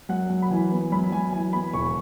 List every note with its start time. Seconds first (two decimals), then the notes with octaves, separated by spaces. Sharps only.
0.09 F#2 F#5
0.30 F#2
0.42 B5
0.51 E3 G#5
0.72 B3
0.92 F#2 B5
1.12 F#2 G#5
1.33 E3 G#5
1.53 B3 B5
1.73 E1 C#6